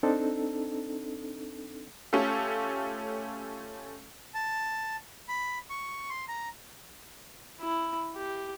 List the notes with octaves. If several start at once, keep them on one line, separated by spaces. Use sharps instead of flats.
C4 D4 D#4 A4
A3 C#4 F4 G4 A4
A5
B5
C#6
C6
A#5
E4
G4